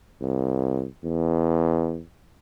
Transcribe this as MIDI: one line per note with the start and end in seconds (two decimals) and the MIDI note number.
0.21 0.86 36
1.04 2.03 40